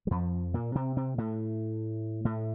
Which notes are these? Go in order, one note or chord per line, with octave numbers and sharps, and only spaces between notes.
G3
F2 F3
A#2 A#3
C3 C4
C3 C4
A2 A3
A2 A3